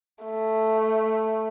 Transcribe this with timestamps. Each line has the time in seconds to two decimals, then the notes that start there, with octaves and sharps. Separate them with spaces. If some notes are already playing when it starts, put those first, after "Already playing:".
0.23 A3